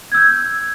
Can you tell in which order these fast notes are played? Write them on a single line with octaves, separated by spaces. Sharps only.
G#6 E6 G6